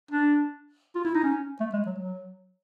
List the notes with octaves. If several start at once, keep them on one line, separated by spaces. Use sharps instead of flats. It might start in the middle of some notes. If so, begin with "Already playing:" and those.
D4
F4
E4
D#4
C#4
A3
G#3
F#3
F#3